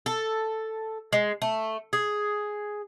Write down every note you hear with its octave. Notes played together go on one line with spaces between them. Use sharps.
A4
G#3
A3
G#4